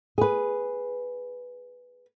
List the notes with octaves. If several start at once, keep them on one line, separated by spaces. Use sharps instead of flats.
G#4 B4